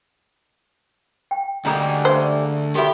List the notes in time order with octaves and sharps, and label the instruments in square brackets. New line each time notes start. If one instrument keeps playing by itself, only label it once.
[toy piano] G5
[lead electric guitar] D2 [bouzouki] G3 G#3 A#3 [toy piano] C#4 A#5 D#6
[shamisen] C5 [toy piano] D5 E5
[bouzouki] D#3 F#3 E4 [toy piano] F#4 A4 [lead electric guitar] G4